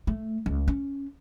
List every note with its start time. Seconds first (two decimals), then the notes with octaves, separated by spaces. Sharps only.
0.07 A3
0.46 C#2
0.68 C#4